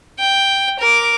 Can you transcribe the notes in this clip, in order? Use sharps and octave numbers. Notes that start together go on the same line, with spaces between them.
G5
A#4 D6